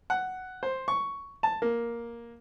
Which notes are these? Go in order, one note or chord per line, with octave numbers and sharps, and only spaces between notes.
F#5
C5
C#6
A5
A#3